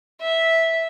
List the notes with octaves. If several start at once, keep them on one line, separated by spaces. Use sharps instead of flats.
E5